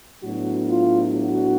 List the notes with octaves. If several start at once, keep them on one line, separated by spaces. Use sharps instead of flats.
A2 F#3 B3 D4 F#4
F4
F#4